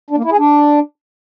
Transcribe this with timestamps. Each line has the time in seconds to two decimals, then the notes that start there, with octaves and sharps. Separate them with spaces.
0.11 D4
0.18 A#3
0.25 E4
0.32 G#4
0.39 D4